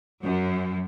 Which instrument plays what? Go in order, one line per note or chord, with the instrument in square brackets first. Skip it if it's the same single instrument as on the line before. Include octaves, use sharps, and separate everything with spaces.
[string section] F#2